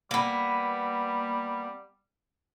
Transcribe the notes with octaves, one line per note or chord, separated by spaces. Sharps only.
G3 A#3 B3